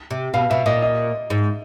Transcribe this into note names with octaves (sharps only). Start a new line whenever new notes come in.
C3
B2 F5
B2 E5
A#2 D#5
D#5
G#2